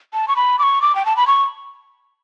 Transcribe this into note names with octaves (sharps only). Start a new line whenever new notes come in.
A5
C#6
B5
D6
C#6
D6
G5
A5
B5
C#6